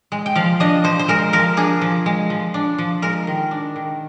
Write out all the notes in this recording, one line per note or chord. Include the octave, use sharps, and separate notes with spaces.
G#3
G5
F3 F5
D4 D#5
F3 C5
C5
G#3 A#4
F3 A#4
D4 G#4
F3
G#3
F3
D4
F3
G#3 A#4
D#3
D4
D#3